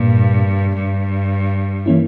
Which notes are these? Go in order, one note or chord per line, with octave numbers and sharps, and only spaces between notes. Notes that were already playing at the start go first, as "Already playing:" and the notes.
Already playing: G2 A#2 A#3
G2
E3 A#3 C#4 E4